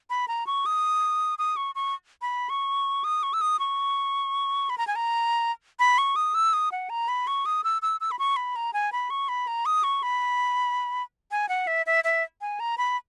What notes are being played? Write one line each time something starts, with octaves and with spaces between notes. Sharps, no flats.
B5
A#5
C#6
D#6
D#6
C#6
C#6
B5
C#6
D#6
C#6
E6
D#6
C#6
B5
A#5
G#5
A#5
B5
C#6
D#6
E6
D#6
F#5
A#5
B5
C#6
D#6
E6
E6
E6
B5
C#6
B5
A#5
G#5
B5
C#6
B5
A#5
D#6
C#6
B5
G#5
F#5
E5
E5
E5
G#5
A#5
B5